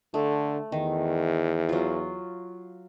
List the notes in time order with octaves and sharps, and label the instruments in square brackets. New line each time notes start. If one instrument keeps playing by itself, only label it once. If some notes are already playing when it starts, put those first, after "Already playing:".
[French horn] D3 [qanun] A3
[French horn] E2 [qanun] D#3
[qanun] F#3 F4